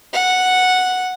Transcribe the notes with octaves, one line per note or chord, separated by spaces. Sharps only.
F#5